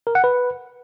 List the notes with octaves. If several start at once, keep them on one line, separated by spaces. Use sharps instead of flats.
A#4
F#5
B4